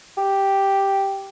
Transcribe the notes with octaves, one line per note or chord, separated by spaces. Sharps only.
G4